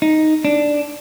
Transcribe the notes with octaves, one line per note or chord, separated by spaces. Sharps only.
D#4
D4